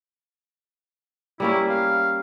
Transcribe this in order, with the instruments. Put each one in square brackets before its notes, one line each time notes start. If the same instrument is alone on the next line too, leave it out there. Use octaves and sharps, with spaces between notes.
[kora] G3 A#3 C#4 [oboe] E4
[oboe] F5